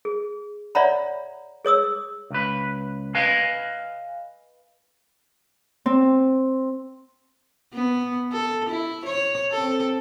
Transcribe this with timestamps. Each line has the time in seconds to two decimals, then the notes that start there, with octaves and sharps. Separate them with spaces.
0.05 G#4
0.75 C#5 D5 E5 F#5 A#5 B5
1.65 G#4 C#5 D#6 E6
2.30 C#2 B4
3.15 B4 D#5 F5 G#5
5.86 C4
7.73 B3
8.32 A4
8.69 E4
9.05 C#5
9.52 C4 A4